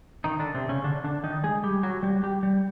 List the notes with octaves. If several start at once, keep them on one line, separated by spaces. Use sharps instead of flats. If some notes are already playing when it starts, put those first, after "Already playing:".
D#3 D#4
D3 D4
C3 C4
C#3 C#4
D3 D4
D3 D4
D#3 D#4
G#3 G#4
G3 G4
F#3 F#4
G3 G4
G3 G4
G3 G4